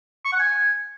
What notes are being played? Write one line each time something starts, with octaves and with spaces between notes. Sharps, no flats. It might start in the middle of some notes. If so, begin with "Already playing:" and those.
C#6
F#5
G#5